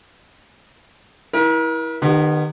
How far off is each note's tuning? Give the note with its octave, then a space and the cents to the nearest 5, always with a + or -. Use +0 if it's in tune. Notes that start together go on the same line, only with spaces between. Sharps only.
E4 -15 A#4 +40
D#3 -35 B3 +0 G4 +20